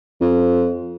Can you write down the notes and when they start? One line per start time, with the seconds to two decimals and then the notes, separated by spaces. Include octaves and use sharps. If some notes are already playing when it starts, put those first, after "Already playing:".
0.21 F2